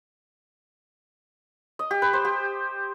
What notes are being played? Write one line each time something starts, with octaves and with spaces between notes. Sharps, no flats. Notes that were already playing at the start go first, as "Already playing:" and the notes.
D#5
G4
B4
C5
G4